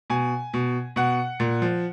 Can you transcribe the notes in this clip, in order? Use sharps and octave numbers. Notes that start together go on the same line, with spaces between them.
B2 G#5
B2
B2 F#5
A#2
F3